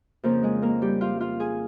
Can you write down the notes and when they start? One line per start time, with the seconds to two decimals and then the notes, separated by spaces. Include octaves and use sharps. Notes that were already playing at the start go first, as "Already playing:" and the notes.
0.23 F2 C#3 F3 A#3 A#4
0.43 G#3 G#4
0.62 A#3 A#4
0.82 G3 G4
1.01 F4 F5
1.20 F4 F5
1.40 G#4 G#5